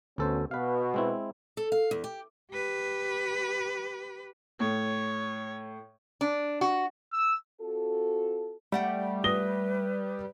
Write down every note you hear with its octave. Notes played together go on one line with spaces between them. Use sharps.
D2 B2 C#4 A4 C5
B2 B4 F5
G#3 C4 E4
A4
F5
E2
G4
G4 B4
A2 C#5
D4
F#4
E6
C4 F4 F#4 A4
G3 A3 F#5 G5
B4 D#6 A#6 G7